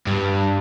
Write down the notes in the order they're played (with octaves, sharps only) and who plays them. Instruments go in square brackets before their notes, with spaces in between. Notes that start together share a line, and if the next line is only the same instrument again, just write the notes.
[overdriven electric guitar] G2